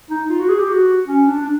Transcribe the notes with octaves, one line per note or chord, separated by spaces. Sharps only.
D#4
F4
F#4
G#4
G4
F#4
C#4
D4
D4